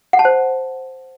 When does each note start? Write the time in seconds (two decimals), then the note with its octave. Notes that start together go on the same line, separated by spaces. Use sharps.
0.13 F#5
0.19 A5
0.25 C5